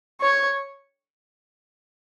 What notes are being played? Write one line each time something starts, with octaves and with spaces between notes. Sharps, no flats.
C#5